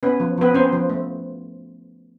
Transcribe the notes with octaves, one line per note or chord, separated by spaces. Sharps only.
B3 C#4 B4
F3
F3 B3 B4
C4 C#4 C5
F3
A3